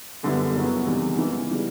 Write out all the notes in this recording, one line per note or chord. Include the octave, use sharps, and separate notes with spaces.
F#2 D3 G3 B3 E4
F#2 C#3 F#3 B3
E2 C3 D#3 G3
C#3 E3 G#3 B3
C#3 E3 G3 B3